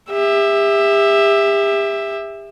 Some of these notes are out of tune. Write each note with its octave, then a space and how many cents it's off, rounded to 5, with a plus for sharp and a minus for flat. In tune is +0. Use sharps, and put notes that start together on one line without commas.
G4 +40 E5 +0